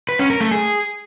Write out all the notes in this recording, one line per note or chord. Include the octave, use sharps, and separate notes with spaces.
B4
C#4
A#4
A3
G#4